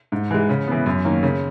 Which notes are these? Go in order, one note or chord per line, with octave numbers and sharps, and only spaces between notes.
G#2
E3 G#3
C#3
E3 B3
F#2
D#3 A#3 C#4
C#3